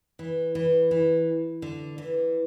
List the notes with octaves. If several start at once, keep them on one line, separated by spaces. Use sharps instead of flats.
E3
E3
E3
D3
E3